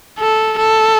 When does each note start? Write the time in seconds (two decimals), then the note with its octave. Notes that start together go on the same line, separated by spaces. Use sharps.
0.20 A4
0.59 A4